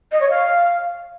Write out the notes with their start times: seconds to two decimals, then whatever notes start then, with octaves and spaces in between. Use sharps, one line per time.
0.12 D#5
0.21 C#5
0.30 F5